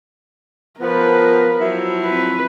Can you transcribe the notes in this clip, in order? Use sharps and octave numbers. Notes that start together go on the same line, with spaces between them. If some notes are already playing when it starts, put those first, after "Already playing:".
F3 B3 A#4 B4
F3 F#3 E4
C4 B4